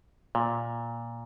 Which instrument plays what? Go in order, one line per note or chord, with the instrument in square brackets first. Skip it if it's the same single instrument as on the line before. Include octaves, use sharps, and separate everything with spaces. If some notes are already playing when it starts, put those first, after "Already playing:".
[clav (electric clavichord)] A#2